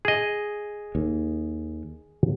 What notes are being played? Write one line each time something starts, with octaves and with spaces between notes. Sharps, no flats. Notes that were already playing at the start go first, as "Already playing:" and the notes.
G#4 D#5
D#2